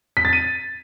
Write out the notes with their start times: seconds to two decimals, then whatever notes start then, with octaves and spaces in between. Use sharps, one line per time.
0.17 B6
0.25 A6
0.33 D#7